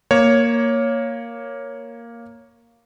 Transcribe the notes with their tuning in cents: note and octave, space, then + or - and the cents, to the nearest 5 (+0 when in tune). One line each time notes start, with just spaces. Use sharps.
A#3 +0 C#5 +0